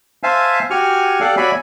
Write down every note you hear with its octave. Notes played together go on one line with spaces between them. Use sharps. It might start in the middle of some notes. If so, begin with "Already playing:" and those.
C5 E5 F5 G#5 A5
F#4 G4 G#5 C#6 F6
G4 A4 D5 F5 F#5
F#4 C#5 D5 E5 G#5 B5